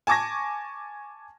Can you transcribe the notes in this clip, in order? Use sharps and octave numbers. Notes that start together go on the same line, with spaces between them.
G#5 A5 C#6 D6 G#6 A#6